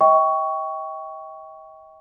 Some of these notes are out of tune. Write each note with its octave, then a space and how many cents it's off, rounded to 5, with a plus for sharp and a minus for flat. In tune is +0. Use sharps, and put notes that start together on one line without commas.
D#5 +40 G5 +0 C#6 +15